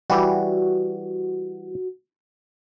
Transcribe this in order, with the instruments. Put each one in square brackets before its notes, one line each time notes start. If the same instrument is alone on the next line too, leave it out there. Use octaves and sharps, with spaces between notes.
[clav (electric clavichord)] E3 G3 [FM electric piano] F#4